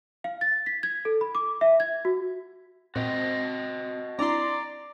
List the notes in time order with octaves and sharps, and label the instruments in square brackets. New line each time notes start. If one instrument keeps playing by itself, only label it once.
[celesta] F5
A6
B6
G#6
A4
B5
D6
E5
G#6
F#4
[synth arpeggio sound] A#2 [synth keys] C4 [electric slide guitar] F#4 D#5 G5
[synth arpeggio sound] C4 D4 E4 [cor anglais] D5 [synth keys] A#5 C6